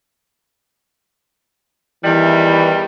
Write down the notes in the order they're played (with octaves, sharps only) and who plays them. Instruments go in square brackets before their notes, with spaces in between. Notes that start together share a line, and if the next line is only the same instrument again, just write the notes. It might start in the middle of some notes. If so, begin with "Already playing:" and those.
[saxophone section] E2 D#3 G3 [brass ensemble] E3